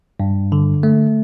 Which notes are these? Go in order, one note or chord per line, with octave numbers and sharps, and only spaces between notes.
G2
D3
A3